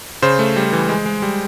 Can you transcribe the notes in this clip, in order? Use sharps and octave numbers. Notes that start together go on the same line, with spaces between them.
C#3 C5
A3
G3
E3
G#3
G#3
G3